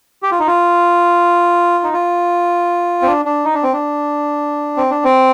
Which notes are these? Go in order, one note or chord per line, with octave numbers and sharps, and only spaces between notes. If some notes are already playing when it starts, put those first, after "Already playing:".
G4
F4
D#4
F4
D#4
F4
C4
D4
D4
D#4
D4
C4
D4
C4
D4
C4